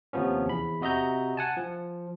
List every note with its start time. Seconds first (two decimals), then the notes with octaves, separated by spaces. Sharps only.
0.13 D#2 C3 F3 B3 C#4
0.46 E2 B5
0.81 C3 F#4 D#5 E5 A#5 G6
1.37 F#5 G#5 A5
1.57 F3